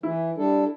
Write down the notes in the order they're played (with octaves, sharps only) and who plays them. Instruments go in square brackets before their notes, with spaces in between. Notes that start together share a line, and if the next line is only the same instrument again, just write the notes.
[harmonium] E3 [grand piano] E4
[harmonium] G3 D4 A4